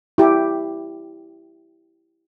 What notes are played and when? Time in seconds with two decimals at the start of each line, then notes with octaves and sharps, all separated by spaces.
0.18 E4 G4